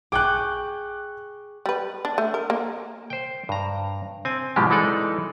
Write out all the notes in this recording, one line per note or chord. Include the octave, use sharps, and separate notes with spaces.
G#4 G5 C#6 D6 F#6
G3 B4
D4
A3
A#4
A#3
C5 G5
G2 A#5
C4 G#5
G#2 B2 E3 F3 G#3 G4
E3 G#3 D#4 A4 D5